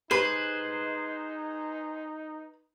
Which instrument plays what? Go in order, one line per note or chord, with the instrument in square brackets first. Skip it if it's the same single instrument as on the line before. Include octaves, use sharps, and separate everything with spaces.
[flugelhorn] D#4 [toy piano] G4 C6 [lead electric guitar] G#4 C5 [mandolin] B4